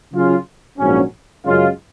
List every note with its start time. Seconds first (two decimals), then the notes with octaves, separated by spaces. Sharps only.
0.13 C#3 F#3 C#4 F4 G#4
0.78 A#1 G#2 F#3 C#4
1.45 F#2 C#3 G#3 C#4 F4